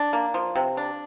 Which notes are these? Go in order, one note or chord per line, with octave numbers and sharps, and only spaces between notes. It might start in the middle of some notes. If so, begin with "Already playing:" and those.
Already playing: D4
A#3
F3
C3
D4